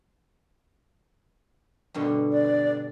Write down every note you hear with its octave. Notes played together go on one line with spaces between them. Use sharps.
G2 B2 D3
D5